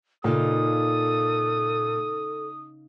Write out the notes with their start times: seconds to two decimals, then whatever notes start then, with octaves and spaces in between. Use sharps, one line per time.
0.24 A#2 C#3 D#4 A4 F5 D#6